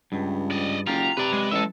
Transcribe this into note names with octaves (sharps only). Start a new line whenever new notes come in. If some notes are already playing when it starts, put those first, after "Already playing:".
C#2 G2
D5 D#5
F#1 F4 G4 A#5
C3 B4 D5
G#3
A1 A4 E5